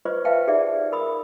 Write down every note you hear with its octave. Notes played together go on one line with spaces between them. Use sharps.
F4 B4 C5 D#5 C#6
B4 E5 F5 G5 A5
D#4 G4 G#4 D5 E5 F#5
A#4 B5 D#6